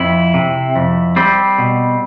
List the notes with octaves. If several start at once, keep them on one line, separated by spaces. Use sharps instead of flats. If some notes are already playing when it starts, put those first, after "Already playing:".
Already playing: F2 E4
C3
F2
G3 C4
B2